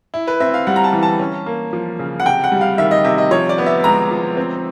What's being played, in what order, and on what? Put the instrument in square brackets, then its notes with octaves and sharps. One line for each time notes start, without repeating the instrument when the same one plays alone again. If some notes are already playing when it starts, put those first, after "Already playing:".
[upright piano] E4
[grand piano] B4
[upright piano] C4 [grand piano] E5
[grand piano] F5
[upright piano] G3 [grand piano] F#5
[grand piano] A#5
A5
[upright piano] E3
[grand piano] A5
[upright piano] C#4
A#3
F3
C#3
[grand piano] F#5
[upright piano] C3 [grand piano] G5
[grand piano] F#5
[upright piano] G3
[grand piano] F5
[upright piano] D#3 [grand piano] E5
[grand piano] D#5
[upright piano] C3 [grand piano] E5
[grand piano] D#5
[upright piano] F3 [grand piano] C#5
[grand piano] D5
[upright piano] B3
[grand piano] E5
[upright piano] G#3 [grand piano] A#5
[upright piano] F3
C4